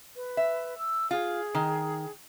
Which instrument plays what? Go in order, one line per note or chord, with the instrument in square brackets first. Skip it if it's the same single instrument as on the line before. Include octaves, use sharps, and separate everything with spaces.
[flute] B4
[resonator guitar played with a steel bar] E5
[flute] E6
[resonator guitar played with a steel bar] F4 [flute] G#4
[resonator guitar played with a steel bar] D#3